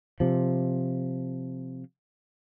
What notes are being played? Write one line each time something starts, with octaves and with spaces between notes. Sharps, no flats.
C3 F3